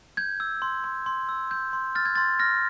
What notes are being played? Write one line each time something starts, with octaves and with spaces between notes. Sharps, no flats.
G6 G#6
E6
C6
C6
C6
E6
G6
C6
F6 A6
G#6
C6 A6
F6 A#6